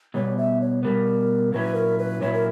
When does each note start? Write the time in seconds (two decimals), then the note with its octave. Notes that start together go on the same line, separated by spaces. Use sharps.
0.14 B2 G3 B3 C#5
0.37 E5
0.61 C#5
0.83 B2 G3 B3 A#4
1.52 A#2 F#3 C#4 E4 B4
1.75 A#4
1.98 B4
2.21 A#2 F#3 C#4 E4 C#5
2.33 A#4